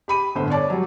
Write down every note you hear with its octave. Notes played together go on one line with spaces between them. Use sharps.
G4 B5 D#7
G1 A2 B3 C5
C#5 D5 A5 D6
F#3 G3